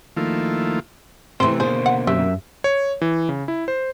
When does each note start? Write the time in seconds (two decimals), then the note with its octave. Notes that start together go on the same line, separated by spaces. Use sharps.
0.17 D#3 F3 A3 A#3 E4 F4
1.40 C3 D#3 E3 A3 C4 C5
1.60 B2 D3 A#3 G#4 C5
1.86 F#5
2.07 F#2 G4 E5
2.64 C#5
3.01 E3
3.29 C#3
3.48 E4
3.68 C5